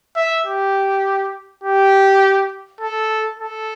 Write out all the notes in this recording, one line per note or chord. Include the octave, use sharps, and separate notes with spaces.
E5
G4
G4
A4
A4